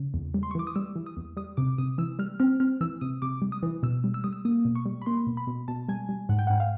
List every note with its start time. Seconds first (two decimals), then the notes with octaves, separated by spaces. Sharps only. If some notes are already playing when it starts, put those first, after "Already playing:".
Already playing: C#3
0.14 E2
0.34 G3
0.43 C6
0.51 C#6
0.55 E3 D6
0.67 D#6
0.76 G3 E6
0.96 E3
1.06 D#6
1.17 E2
1.37 G3 D#6
1.57 C3 D6
1.78 C3 D#6
1.98 E3 E6
2.19 G3 F6
2.40 C4 F6
2.60 C4 F6
2.81 E3 E6
3.01 C3 D#6
3.22 C3 D6
3.42 G3
3.52 D#6
3.63 E3
3.83 B2 E6
4.04 G3
4.14 E6
4.24 G3 D#6
4.33 E6
4.45 A#3 D#6
4.65 B2
4.76 C#6
4.86 G3
5.02 B5
5.06 A#3 C6
5.27 B2
5.37 B5
5.47 B2
5.68 B2 A5
5.89 G3 G#5
6.09 G3
6.29 G#2 F#5
6.39 G5
6.47 G#2 F#5
6.60 F5